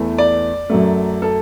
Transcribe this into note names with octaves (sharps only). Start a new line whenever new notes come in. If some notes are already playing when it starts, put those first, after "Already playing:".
Already playing: E2 E3 A3
D5
F#2 F#3 A3
A4